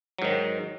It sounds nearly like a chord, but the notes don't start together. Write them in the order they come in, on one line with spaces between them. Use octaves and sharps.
F#3 G#2 D#3